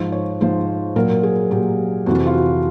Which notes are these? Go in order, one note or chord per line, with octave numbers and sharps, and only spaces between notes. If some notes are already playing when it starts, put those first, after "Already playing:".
Already playing: G#2 F3
C#5
G#2 F3 C5
A#2 F#3 A#4
G#4
A#2 F#3 G4
F2 C3 E3 F#4
F4
F#4